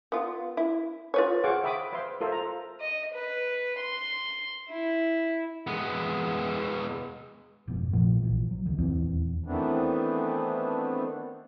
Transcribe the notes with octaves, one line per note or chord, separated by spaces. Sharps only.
B3 F4
E4
F4 B4 C#5
G#4 C5 F5 F#5 C#6 D6
E5 G5 B5 D6 D#6
B4 C5 E5 F5 C6
F4 A4 A#4 C5 E5
A#5
D#5
B4
C6
E4
G#3 B3
F1 G#2 B2
A#1 A#2 F3 A3
A#1 A#2 E3
F#3
G#1 D2 D#3
D#1 E2 E3 C4
D#3 E3 A3 B3 C4 D4